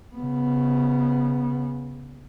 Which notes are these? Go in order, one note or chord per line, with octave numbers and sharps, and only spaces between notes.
C#3 B3